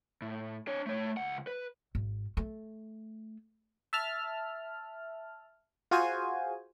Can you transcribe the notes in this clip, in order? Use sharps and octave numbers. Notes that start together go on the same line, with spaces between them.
A2
D4 C#5
A3 C#5
C#2 F#5
B4
G#1
A3
E5 A5 F6
F4 F#4 G#4 C5 G#5